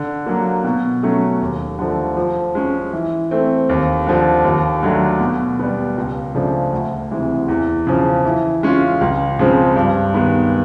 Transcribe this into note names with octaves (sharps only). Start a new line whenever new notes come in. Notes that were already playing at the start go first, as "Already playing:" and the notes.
Already playing: D3
F#3 A#3
B2
F#3 A3 C#4
D#2
D3 F3 A3
F3
G#3 C#4
E3
A3 C4
D#2
D3 F3
D#2
D3 F#3 A3
B2
G3 B3
C#2
C#3 F3 A3 D4
D2
C3 E3 G#3
E2
C#3 F3
E3
G#3 C#4 F4
C#2
C#3 F3 G#3 C4
G2
D#3 G#3 B3